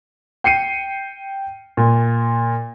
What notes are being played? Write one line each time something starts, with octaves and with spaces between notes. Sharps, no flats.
G5 C7 C#7 D#7
A#2